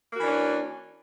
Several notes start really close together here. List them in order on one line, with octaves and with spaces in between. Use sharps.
A#3 F#4 E3 D4 C#4